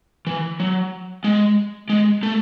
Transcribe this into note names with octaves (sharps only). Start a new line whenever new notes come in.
E3
F#3
G#3
G#3
A3